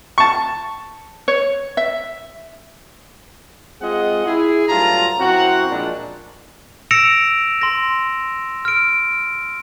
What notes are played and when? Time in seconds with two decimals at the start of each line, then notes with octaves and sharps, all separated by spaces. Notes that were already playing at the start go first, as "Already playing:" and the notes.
0.18 A5 C#6
1.28 C#5
1.77 E5
3.82 G#3 C4 F4 G#4 D#5 F#5
4.26 E4 G#4
4.69 G2 F#3 A3 F4 A5 A#5
5.19 F#2 C4 E4 F#4 F#5 A#5
5.70 A#2 F3 G#3 D4
6.91 E6 A#6 C#7 D7 E7 F7
7.61 C6 A#6
8.65 F6 D7